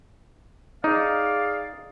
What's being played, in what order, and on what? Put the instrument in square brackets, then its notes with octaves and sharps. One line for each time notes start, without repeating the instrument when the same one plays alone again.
[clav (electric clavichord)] D#4 [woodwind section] G#4 D5 F5